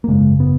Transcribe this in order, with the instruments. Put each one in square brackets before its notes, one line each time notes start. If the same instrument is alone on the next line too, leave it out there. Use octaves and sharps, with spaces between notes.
[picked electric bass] A#3
G#1 F#2 C#3 G#3
B3